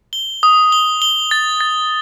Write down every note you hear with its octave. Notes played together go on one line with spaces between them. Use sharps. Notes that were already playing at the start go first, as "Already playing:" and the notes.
G7
D#6
G7
G7
A6
A6